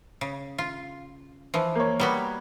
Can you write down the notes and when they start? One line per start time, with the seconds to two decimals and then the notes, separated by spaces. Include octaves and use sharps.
0.21 C#3
0.58 F4
1.54 E3 F3
1.75 A#3 C#5
2.00 G3 B3 F#4